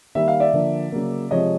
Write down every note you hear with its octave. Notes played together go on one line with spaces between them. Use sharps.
D#3 G3 A#3 E5
F5
D5 E5
D3 F3 A#3
C#3 F#3 A#3
C3 F3 G#3 C#5 D#5